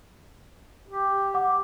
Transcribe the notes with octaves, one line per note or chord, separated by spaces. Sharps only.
G4
F#5 D6